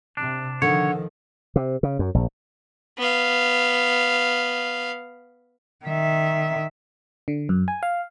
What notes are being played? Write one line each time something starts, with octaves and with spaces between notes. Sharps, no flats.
C3 D4
D3 D#3 F3 C#5
C3
C#3
F#2
A#1
B3 F5
D#3 E5
D3
F#2
G#5
F5